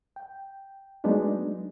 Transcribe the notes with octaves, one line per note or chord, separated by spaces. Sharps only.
G5
F#3 G#3 A3 B3 D4 D#4